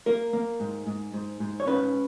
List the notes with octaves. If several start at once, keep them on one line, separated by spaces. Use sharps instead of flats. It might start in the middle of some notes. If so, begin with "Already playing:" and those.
A#3 A#4
A#3
G#2
G#2
G#2
G#2
C#5
C#4 B4